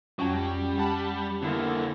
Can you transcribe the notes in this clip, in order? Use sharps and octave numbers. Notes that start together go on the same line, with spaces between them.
F2 F#3 C#4 G5
G3
G3 F#5 A5 B5
D3 A#3 B3 E4 A4